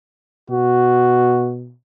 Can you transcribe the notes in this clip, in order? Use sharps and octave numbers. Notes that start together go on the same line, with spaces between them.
B2 F#4